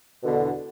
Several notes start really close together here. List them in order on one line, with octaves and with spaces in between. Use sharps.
B2 D3 E2